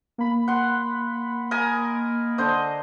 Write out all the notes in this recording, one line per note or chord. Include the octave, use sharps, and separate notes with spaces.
A#3 B5
F#5 C6
A#4 D#5 G#5
D3 C5 D#5